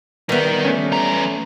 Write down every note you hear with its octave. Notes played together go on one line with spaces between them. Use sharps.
D#3 G3 B3 A#4
A3 C#4
E2 A#5